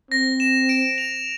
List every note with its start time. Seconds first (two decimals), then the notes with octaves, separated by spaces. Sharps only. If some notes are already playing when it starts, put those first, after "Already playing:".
0.11 C4 A#6
0.40 E7
0.69 D7
0.98 F7